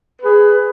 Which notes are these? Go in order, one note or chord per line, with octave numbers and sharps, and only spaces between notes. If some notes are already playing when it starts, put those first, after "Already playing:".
G#4 B4